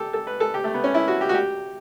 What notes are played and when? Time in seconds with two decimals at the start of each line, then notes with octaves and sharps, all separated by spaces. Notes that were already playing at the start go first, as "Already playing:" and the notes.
Already playing: G4 A4
0.13 A4
0.27 B4
0.40 A4
0.54 G4
0.64 A3
0.74 B3
0.84 C#4
0.94 E4
1.08 F#4
1.21 G4
1.29 F#4
1.35 G4